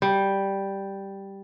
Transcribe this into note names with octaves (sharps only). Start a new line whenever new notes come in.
G3